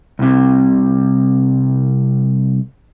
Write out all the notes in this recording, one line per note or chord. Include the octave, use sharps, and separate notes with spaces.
C2 C3